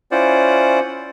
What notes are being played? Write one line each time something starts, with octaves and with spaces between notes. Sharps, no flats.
C#4 E4 F4 C5 D5 F#5